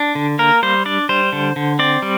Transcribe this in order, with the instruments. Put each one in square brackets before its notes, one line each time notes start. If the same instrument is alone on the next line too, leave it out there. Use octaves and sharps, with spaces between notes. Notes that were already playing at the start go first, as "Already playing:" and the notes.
Already playing: [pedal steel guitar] D4
D3
A#3 A#4
G3 C5
D4 D5
G3 C5
D3
D3
C4 D5
G3